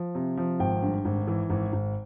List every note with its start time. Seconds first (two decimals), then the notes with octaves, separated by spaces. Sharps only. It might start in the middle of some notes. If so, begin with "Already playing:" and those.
Already playing: F3
0.15 C3
0.37 F3
0.60 G#1 G5
0.82 G2
1.05 G#1
1.27 E3
1.50 G#1
1.73 G#1